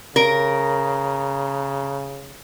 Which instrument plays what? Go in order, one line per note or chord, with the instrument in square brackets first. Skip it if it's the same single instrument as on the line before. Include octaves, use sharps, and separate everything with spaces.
[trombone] C#3 [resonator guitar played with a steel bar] A#4